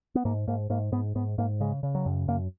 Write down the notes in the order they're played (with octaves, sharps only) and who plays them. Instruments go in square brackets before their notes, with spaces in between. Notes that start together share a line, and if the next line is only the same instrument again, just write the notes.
[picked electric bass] B3
G#2 A#3
G#2 A#3
G#2 A#3
G#2 B3
G#2 B3
G#2 A#3
C#3 G#3
C#3
F#3
F#2
F#2 A#3